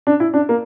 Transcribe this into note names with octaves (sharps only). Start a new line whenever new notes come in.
D4
E4
D4
A#3